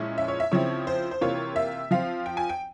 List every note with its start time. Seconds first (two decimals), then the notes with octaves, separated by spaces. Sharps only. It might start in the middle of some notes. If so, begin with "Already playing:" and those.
Already playing: A#2 F3 G#3 C#4 E4
0.18 E5
0.28 C#5
0.40 E5
0.52 C#3 F3 C4 E4 C#5
0.87 C5
1.11 C5
1.21 C3 E3 A#3 F4 C#5
1.56 E5
1.91 F3 C4 F4 F5
2.26 G5
2.37 G#5
2.49 G5